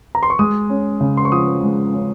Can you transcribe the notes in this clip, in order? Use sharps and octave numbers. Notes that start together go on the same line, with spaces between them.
A#5
C6
C#6
G#3 D#6
C#4
C#3
C6
C#6
F3 D#6
G#3
C#4